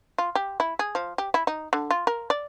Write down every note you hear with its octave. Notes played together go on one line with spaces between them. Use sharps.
F4
G4
E4
G#4
F3
G4
E4
D#4
D3
F4
A#4
D5